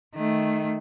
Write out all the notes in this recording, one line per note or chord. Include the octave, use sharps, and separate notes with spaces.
D#3 A3